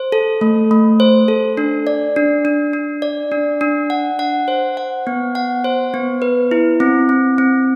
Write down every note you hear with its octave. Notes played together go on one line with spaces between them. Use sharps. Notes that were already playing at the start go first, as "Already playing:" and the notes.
Already playing: C5
A4
A3
A3
C5
A4
D4
D5
D4
D4
D4
D5
D4
D4
F#5
F#5
C5
F#5
B3
F#5
C5
B3
B4
E4
C4
C4
C4